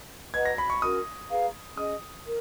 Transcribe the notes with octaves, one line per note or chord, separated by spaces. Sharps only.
B4 D#5 F#5 A#5 G#6
A#6
B5
C#6
C#4 F#4 A#4 D#6
G#4 B4 F5 A#5
C#4 G#4 D#5 D#6
A#4